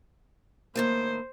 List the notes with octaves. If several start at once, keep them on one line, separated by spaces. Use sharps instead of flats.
A2 D#3 A#3 C5